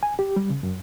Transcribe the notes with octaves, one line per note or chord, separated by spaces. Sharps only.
G#5
G4
G3
C#3
F#2